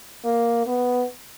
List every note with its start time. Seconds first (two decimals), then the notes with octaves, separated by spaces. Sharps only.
0.25 A#3
0.67 B3